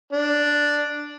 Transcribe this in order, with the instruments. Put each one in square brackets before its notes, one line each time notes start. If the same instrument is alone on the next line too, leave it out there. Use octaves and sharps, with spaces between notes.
[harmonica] D4